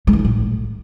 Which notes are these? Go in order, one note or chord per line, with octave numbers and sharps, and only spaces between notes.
G#3
E3
C#3
A2